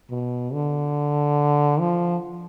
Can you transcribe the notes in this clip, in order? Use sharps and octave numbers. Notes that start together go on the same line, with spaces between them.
B2
D3
F3